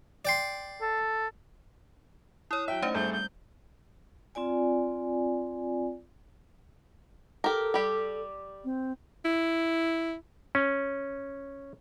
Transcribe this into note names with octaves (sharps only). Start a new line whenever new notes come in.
D5 G5 C6
A4
E4 C#5 D#6
F#3 E5 G5
A3 C#4 D#4 C5
G#1 G3 A3 G#4 G6
G6
C4 F4 D5 G#5
G4 A4 A#4
G3 G4
C4
E4
C#4